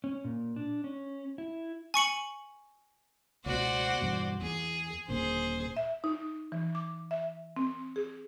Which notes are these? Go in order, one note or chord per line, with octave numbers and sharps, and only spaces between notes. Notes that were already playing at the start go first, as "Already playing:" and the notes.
C#4
A#2
D4
C#4
E4
G#5 C#6 C#7 F#7
C#2 B2 F#4 C5 D5
E2 G2 B2
E2 G#4
D#1 A#2 D3 G#4 C5
E5
D#4
E3
D6
E5
C4
G#4